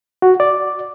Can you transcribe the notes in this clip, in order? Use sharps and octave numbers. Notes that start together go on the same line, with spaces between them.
F#4
D5